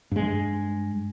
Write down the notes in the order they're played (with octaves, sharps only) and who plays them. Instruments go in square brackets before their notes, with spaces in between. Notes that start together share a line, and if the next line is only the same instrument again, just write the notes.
[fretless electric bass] G2 G#3